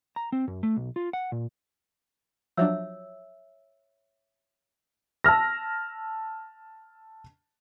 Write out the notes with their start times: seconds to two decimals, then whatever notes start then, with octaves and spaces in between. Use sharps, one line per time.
0.16 A#5
0.32 C4
0.48 F#2
0.63 A3
0.77 B1
0.96 F4
1.13 F#5
1.32 A#2
2.57 F3 F#3 D4 C#5 E5 E6
5.24 A5 E6 F6 A#6